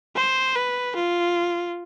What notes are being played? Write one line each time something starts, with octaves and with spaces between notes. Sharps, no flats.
C5
B4
F4